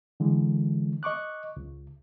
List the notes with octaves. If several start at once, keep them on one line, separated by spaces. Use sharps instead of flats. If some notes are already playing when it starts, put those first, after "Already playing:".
D3 E3 G#3
D#5 C#6 D6 F#6
C#2